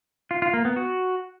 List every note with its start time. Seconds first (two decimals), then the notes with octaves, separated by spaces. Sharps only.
0.31 F4
0.42 F4
0.54 A#3
0.65 B3
0.76 F#4